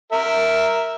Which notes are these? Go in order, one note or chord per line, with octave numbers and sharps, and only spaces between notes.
A#4 E5